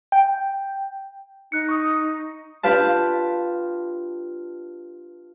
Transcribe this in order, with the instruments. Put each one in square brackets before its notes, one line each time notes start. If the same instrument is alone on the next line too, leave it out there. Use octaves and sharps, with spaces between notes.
[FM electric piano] G5
[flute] D#4 [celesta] F#6 C#7
[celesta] C#6 D#6
[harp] D4 F4 G4 B4 F5 A5